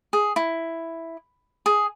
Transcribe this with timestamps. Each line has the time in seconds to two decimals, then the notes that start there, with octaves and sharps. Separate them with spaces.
0.13 G#4
0.36 E4
1.66 G#4